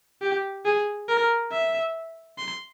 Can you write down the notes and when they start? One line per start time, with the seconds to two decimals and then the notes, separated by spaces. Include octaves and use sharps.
0.22 G4
0.65 G#4
1.09 A#4
1.52 E5
2.38 C6